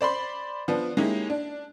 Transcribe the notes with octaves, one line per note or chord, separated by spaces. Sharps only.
C5 D5 B5 C6
F3 B3 D4
G#3 A#3 C#4 D#4 E4 G4
D4